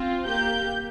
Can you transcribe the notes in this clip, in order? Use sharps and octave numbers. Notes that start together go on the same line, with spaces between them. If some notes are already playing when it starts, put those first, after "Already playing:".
Already playing: C4 F4
A#3 G4 G6